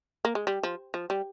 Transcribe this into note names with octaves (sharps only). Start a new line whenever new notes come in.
A#3
G#3
G3
F3
F3
G3